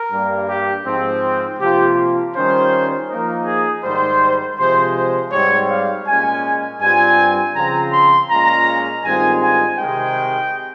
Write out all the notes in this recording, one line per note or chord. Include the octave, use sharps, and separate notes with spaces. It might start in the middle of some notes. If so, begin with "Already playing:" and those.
Already playing: A#4
G2 G3 A#3
G4
G#2 F3 C4
C3 F3 A#3 F4 G4
D#3 G3 C#4 F4 C5
F3 A#3 D#4 A#4
G#4
G#2 D#3 G3 C5
C3 F3 G#3 C5
C5
G#2 G3 C4 C#5
F5
A#2 G#3 C#4 G#5
G2 G3 C4 F4 G#5
C#3 F3 C4 F4 A#5
C6
A#2 G#3 C#4 F4 A#5
G2 D#3 G#3 C4 F4 G#5
G#5
C3 D#3 G#3 G5